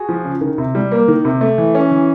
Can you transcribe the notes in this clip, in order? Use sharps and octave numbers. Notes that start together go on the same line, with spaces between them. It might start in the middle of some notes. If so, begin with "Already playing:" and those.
Already playing: F#4 G#4
F3
C#3
D#3
C3
G3
A#3
D#3
C3
A3
E3
C#4
E3